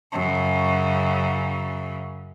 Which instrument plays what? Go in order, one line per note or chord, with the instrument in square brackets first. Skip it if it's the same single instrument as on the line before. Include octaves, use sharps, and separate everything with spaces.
[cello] F#2 C#3